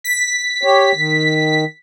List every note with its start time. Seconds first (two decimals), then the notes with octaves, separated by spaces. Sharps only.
0.04 B6
0.63 G4 C#5
0.95 D#3